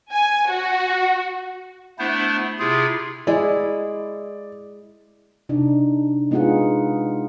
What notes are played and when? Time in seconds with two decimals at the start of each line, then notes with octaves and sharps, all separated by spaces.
0.12 G#5
0.50 F#4
1.99 A3 B3 D4 E4 C5
2.59 C3 E4 F4 G#4
3.27 G#3 E4 D5
5.49 C3 D4 D#4
6.31 G#3 B3 D#4 F4 G#4 F#5